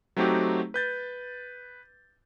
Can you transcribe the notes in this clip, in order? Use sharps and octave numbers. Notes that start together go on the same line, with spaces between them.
F#3 A3 C4 D#4 F#4 G4
B4 G6 A6